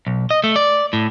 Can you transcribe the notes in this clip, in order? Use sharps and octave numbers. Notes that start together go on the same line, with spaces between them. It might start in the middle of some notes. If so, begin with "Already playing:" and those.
B1
D#5
A3
D5
A2